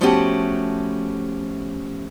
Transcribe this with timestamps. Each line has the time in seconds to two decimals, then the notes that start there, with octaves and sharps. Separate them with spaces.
0.01 F3 A3 B3 C#4 F#4 G4